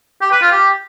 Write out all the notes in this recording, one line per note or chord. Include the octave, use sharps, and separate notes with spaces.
G4
B4
F4
G4